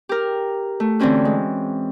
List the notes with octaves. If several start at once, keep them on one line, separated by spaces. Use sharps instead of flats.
G4 A#4
A3
D3 E3 C4 C#4 F#4
G#3